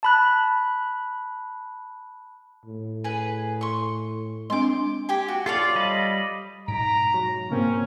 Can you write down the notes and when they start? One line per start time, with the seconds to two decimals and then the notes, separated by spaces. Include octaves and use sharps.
0.03 A5 B5 F#6
2.66 A2
3.04 G#4 B4
3.61 C6 C#6
4.50 G#3 C4 D4 C6 D6
5.09 G4 G5 G#5
5.28 F#4
5.46 F4 A4 C#5 D5 F5
5.75 G3 D#5 B5
6.68 G#2 B2 G#3 A#5 B6 D7
7.14 F#3
7.51 C#3 A#3 C4 C#4